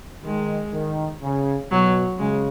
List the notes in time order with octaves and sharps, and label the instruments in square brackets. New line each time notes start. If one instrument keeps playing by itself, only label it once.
[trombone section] D#3 [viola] G#3
[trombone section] D#3
C#3
[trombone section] B2 [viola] F#3
[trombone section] C#3 [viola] G#3